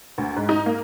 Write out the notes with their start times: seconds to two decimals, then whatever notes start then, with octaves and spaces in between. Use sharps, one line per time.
0.18 D2
0.36 G#2
0.49 D#4
0.66 A#3